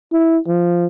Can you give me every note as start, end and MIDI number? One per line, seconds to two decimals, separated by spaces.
0.12 0.38 64
0.47 0.87 53